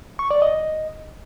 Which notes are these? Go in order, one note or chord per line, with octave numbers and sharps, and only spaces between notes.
C#6
D5
D#5